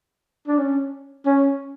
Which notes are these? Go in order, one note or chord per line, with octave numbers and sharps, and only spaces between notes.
D4
C#4
C#4